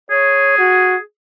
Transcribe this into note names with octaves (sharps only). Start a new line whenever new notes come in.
G#4 C#5
F#4